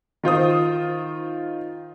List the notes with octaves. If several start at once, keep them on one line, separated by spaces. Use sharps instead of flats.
D#3 F4 C5 D#6